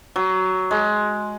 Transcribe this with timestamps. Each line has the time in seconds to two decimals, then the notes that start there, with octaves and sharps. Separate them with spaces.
0.16 F#3
0.71 G#3